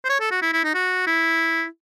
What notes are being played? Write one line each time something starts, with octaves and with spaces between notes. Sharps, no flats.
C5
C#5
A4
F#4
E4
E4
D#4
F#4
E4